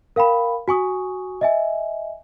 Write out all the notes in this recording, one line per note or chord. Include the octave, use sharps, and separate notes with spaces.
A#4 F5 G5 B5
F#4 G#5 C#6 D#6
D#5 E5 G#5